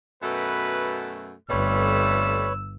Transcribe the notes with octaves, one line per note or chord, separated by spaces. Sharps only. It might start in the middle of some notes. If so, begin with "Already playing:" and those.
F#2 B2 A3 B4
G1 F2 G3 A3 B4 C#5 E6